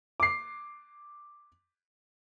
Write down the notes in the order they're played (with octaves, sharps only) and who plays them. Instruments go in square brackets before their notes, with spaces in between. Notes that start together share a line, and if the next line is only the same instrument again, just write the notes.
[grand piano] D6 C7